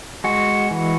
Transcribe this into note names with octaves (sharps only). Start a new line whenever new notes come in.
G#3 F#4
E3